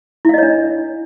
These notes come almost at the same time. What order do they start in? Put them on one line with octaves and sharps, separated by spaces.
E4 F5 D#5 C#5 D4